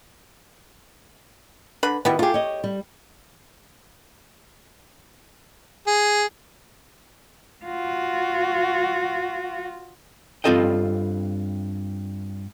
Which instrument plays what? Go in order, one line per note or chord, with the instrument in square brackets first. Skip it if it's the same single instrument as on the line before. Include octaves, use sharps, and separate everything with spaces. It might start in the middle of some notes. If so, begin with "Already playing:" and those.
[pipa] D3 B4 B5
[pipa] B2 G3 B3 [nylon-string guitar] D#3 E4
[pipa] A3 G4 [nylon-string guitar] F4 G#4
[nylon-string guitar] C#5 D#5
G3
[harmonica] G#4
[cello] F4 F#4
[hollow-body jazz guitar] G2 C4 F4 A4 D#5 G5